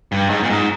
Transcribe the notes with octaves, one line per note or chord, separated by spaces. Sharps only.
G2
G#2
A#2
G#2